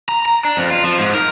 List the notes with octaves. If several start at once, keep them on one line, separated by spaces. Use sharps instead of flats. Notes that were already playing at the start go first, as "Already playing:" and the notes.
A#5
A#5
D4
F2
F4
F3
G#2
A#4